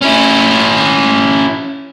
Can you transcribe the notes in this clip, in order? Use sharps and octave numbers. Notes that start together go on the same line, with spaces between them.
C#4 E4